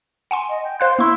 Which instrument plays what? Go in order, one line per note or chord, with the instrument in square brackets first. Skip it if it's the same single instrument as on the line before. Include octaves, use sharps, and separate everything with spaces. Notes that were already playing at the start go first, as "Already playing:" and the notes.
[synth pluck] F#5 G#5 C6
[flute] D#5
G5
[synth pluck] C5 F5 F#6 [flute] C6
[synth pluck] A#3 C6 [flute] E4